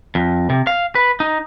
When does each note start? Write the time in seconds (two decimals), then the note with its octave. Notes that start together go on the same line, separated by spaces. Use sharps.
0.15 F2
0.50 C3
0.67 F5
0.95 B4
1.20 D#4